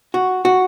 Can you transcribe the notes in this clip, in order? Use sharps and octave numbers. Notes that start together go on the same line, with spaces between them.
F#4
F#4